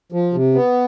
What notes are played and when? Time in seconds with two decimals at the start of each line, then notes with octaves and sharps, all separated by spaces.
0.12 F3
0.34 C3
0.55 B3